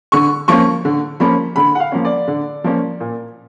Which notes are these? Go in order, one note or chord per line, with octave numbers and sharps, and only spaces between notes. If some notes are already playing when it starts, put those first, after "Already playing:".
D3 C#6
F3 A#3 C#4 C#6
D3
F3 A#3 C#4 B5
D3 B5
F#5
F5
F3 A#3 C#4
D5
D3
F3 A#3 C#4
A#2